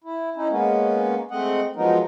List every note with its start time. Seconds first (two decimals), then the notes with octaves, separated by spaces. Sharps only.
0.04 E4
0.36 C#4 D#4 E4
0.50 G#3 A#3 B3 C#4
1.31 G#3 A3 C4 D#5 F#5
1.76 F3 F#3 G#3 B3 D#4 A#4